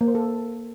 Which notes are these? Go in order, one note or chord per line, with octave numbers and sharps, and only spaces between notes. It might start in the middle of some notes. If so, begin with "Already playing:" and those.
A#3
C5
A4